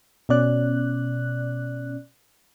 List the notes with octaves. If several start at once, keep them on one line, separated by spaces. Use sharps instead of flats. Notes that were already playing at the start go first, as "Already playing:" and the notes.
B2 C#4 D5 F#6